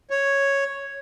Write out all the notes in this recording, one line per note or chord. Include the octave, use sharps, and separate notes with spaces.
C#5